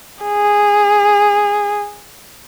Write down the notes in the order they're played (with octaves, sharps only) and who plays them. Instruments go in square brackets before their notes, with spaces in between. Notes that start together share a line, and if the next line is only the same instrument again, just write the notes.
[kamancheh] G#4